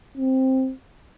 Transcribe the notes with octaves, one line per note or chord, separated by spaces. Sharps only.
C4